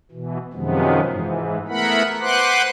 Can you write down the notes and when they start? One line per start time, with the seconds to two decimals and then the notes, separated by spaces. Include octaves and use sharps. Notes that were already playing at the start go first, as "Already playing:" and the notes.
0.11 B2 E3
0.53 F#2 C3 D#3 F3 G#3 B3
1.05 G#2 E3
1.68 A3 B3 E4 A#4 F#5 B5
2.21 B4 C5 F#5 C6 D6 F#6